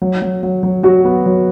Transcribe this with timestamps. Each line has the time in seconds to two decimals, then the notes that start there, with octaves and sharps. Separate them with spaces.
0.02 F#3
0.22 F#3
0.43 F#3
0.63 F#3
0.83 F#3 F#4
1.05 B3
1.26 F#3